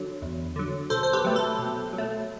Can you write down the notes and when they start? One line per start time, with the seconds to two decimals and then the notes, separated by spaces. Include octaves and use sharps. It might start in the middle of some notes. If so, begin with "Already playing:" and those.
Already playing: D3 F#3
0.22 E2
0.56 D3 F#3
0.90 B2 A4 C5
1.03 C5
1.13 G4 B4
1.25 F#3 A3
1.36 A4
1.59 B2
1.93 F#3
1.98 A3